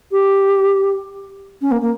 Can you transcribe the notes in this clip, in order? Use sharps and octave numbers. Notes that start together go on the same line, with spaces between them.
G4
C#4
A#3
A#3